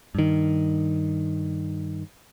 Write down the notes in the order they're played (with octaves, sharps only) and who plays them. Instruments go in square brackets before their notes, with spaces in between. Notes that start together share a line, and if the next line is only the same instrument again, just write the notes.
[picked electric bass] G2 D#3